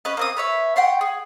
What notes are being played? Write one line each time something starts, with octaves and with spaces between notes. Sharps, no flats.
C#4 B4 D#5
A#3 C4 D#6
B4 C#5 E5
F#5 G5 C6 C#6
G#4